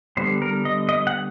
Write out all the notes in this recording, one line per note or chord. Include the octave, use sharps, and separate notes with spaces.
D3 G3 B3 C5
A#4
D#5
D#5
F#5